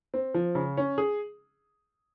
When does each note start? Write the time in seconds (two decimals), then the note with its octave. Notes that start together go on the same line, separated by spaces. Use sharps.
0.14 C4
0.34 F3
0.55 C#3
0.77 C#4
0.98 G#4